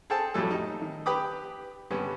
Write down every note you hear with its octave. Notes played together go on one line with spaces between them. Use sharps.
G#4 A4 C5 G5 A5
F2 A2 F#3 G3 A3 A4
D#4
D#3
G4 B4 G5 B5 D6 D#6
G2 D3 G3 B3 C#4